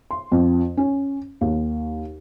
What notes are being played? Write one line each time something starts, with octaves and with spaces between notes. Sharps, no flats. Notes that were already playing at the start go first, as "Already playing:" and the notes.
C6
F2
C#4
D#2